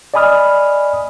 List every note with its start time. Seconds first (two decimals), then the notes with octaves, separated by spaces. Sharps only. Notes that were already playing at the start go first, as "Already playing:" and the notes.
0.14 D5 D#5 G#5 B5 D#6 F6